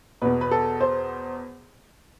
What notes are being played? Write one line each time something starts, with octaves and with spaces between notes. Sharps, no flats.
E2 B2 B4
B4
A4
C5